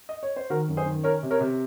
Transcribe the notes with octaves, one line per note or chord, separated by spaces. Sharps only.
D#5
C#5
C5
D#3 F#4 A#4
F#2
G#4 C5
D#3
C#4 A#4 C#5
C3
A#4 C#5
C3